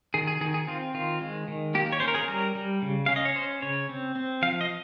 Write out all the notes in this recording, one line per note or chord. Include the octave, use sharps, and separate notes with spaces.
D#3 G#4
G#4
D#3 G#4
G#4
C4 F4
D#3 F4
G#3
D#3
A#3 G4
C#5
C#4 C5
A#4
G#4
G3 A#4
G3
C#3
C#4 F5
D#5
C#5
C#4 C5
C#3 C#5
C4
C4
F3 F5
D#5